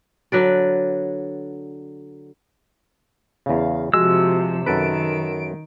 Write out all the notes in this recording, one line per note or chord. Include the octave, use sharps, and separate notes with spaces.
D3 F#3 B4 D5
E2 C#3 F5
C3 F3 G#3 F#4 E6
F#2 D#3 A4 B4 D7